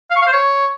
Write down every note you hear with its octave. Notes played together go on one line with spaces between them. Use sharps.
F5
C#6
F5
C5
C#5